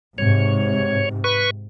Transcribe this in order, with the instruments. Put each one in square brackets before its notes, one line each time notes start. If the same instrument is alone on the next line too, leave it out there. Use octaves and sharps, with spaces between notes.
[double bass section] G#2 C3 [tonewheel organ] C#5
[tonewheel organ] B4 C#6